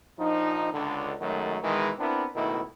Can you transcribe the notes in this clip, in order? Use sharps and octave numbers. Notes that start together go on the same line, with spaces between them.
A#1 F3 D#4
C#2 D3
F#2 D#3 F#3 G#3 A3
B2 D#3 E3 G#3
B3 C4 D4 E4 A#4
C#2 B2 D#3 A3 E4